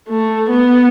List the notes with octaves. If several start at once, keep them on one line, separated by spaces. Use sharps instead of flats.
A3
B3